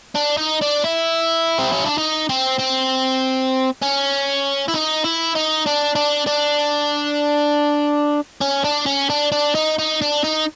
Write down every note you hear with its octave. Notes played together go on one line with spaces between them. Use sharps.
D4
D#4
D4
E4
C4
C#4
D4
D#4
C4
C4
C#4
E4
D#4
E4
D#4
D4
D4
D4
C#4
D4
C#4
D4
D4
D#4
D#4
D4
D#4